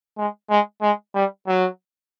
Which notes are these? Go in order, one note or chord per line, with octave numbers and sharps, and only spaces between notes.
G#3
G#3
G#3
G3
F#3